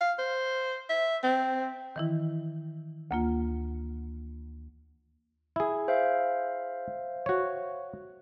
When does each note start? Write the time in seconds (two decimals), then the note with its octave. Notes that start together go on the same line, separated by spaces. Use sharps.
0.01 F5
0.18 C5
0.89 E5
1.23 C4
1.96 D#3 E3 E4
3.11 D2 A#3 F4
5.56 E4 G#4
5.88 C5 E5 F5
7.26 F#4 C#5